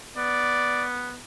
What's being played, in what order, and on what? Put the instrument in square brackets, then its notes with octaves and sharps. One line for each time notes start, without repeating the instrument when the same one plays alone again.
[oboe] B3 [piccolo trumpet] D5